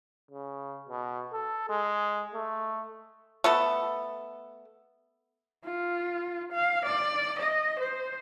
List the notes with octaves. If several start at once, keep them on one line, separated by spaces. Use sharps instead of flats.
C#3
B2
A4
G#3
A3
A3 B3 A4
F4
F5
D5
D#5
C5